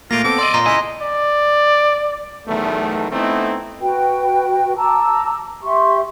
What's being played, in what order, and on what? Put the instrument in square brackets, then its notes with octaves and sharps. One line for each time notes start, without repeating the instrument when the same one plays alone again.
[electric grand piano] A#2 A3 A#3 [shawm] F4 [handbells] A#6 D7
[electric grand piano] B3 C4 A4 [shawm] D6
[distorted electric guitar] D5 D#5 [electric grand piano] C6 E6
[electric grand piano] A#2 [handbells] A#5 C6 A#6
[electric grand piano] C#2 [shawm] E4 [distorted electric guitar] D#5 [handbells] G#5 C6
[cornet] D5
[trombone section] B1 E2 D#3 A3
A3 B3 C4 D#4 E4
[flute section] F#4 B4 G5
A5 A#5 D6 E6
G4 E5 C6 C#6